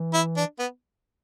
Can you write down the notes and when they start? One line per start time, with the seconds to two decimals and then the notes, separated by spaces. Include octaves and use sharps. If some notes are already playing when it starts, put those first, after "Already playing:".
Already playing: E3
0.14 E4
0.37 D4
0.59 B3